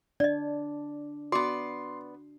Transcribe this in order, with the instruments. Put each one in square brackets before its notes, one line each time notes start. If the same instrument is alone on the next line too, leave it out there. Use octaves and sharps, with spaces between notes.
[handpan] D4 [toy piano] D5 D#5
[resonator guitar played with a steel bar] B3 D5 [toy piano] F#4 [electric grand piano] C6